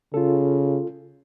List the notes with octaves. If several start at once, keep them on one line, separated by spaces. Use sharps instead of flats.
C#3 F4 A4